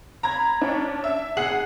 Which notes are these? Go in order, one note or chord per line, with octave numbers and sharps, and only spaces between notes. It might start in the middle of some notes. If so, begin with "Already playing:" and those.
A#5 B5 G#6
C#4 D4
E5
G#4 F#5 C7 F#7